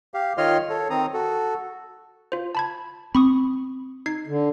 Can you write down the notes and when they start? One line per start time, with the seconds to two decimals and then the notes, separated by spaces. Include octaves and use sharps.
0.14 G4 F5
0.38 D#3 F4 C#5 D#5 C6 F6
0.69 A4 C#5
0.90 D#3 C4 A#5 D#6
1.14 F#4 A4
2.32 F4 C5
2.55 A5 B5 G#6
3.15 C4 B5 C#6 D#6
4.06 D#4 G#6 C7
4.27 D3